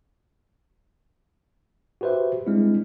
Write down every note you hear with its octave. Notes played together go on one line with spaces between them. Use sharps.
F#4 G4 B4 C5 E5
G3 G#3 C4 D4 E4